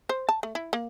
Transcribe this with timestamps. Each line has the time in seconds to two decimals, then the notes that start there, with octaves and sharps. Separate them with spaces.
0.09 C5
0.29 A5
0.43 A3
0.55 E4
0.73 A#3